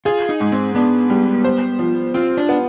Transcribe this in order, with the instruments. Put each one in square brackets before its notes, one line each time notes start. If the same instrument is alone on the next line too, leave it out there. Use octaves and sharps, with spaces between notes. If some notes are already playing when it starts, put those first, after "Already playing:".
[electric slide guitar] F4 [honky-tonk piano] G#4
[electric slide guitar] D#4
[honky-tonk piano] G#2
[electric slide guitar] C4
[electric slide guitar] B3 [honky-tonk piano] D4
[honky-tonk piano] G3
C5
F3
[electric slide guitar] C4 [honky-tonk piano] F4
[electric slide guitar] D4
[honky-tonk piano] B3